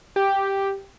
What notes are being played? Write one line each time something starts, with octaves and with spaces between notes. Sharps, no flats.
G4